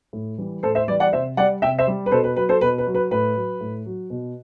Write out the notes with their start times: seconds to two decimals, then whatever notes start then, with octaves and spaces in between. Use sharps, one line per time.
0.13 A2
0.38 E3 G3
0.63 A2 A4 C5
0.75 C5 E5
0.88 G3 B4 D5
0.91 E3
1.00 D5 F#5
1.13 C3 C5 E5
1.37 G3 D5 F#5
1.62 C3 E5 G5
1.78 C5 E5
1.87 G3
2.06 B4
2.11 B2 A4 C5
2.24 B4
2.36 F#3 B4
2.49 A4 C5
2.61 B2 B4
2.78 B4
2.86 F#3
2.95 B4
3.11 A2 B4
3.36 F#3
3.61 A2
3.86 F#3
4.10 B2